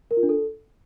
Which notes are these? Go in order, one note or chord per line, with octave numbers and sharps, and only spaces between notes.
A#4
F4
D4
A4